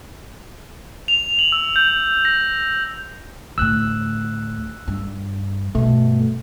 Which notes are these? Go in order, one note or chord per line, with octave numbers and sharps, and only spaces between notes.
F7
F#7
E6
G6
A#6
D2 A2 E6 F#6
G2
G2 B2 A3